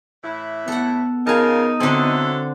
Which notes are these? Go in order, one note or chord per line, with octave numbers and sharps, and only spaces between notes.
A2 E3 E4
B3 A4 F#5
C#3 D#4 F4 A#4 G#5 A5
D3 F#3 C4 E4 A4